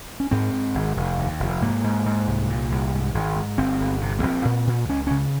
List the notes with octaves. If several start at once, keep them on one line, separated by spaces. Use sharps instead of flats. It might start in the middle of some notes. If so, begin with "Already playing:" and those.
C#4
G#2 C4
G#2
G#1
F1
D#2
F1
G#2 A#3
G#2
G#2
C2
A#2
C2
G#2
G#1
G#2
G1 C4
G1
C3
A#3
A#1 C4
A#2
A#2
C#2 C#4
C#3 C#4